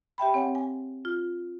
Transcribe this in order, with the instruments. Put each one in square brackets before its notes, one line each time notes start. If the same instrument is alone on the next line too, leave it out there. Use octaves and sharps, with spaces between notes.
[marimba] G4 E5 G5 B5
C4 C#5 F#5 G#5
G#5
F4